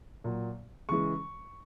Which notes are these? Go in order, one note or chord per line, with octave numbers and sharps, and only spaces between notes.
A#2 F#3
C#3 E3 G#3 C#6